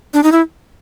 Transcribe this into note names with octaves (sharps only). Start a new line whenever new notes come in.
D4
D#4
E4